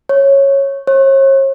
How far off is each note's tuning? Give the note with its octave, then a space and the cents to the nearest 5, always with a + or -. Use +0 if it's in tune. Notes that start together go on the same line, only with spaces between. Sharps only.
C#5 -10
C#5 -40